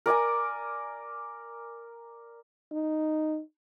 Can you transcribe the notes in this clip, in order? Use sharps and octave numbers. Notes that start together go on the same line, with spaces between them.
A#4 D5 G#5 A#5
D#4